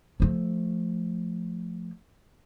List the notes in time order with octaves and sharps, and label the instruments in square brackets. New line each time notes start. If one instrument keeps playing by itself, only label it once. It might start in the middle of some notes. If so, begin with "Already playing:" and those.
[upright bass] F3 A3